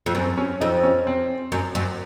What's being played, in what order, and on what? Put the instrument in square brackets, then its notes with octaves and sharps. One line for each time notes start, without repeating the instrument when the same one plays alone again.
[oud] F2
[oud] F#2 [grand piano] C4
[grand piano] C#4
[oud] F2 [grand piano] D#4
[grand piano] C#4
C4
[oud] F#2
F#2